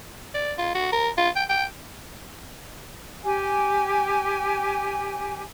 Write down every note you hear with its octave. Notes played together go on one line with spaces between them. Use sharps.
D5
F4
F#4
A#4
F4
G5
G5
G4 G#5